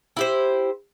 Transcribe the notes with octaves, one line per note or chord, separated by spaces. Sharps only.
E4 G4 C5